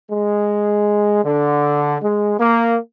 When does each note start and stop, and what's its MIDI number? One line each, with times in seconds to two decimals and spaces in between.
0.11 1.21 56
1.24 1.97 50
2.02 2.34 56
2.39 2.77 58